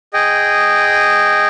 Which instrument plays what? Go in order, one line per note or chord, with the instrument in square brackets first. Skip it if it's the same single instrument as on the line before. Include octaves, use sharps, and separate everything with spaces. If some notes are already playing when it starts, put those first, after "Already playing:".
[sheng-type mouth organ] G#4 D#5 G5